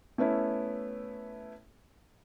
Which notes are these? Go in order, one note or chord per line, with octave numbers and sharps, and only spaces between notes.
A3 B3 C#4 E4